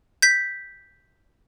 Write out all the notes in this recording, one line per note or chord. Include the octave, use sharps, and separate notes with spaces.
G6 B6